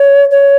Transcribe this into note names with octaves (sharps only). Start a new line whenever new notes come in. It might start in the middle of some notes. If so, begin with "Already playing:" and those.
Already playing: C#5
C#5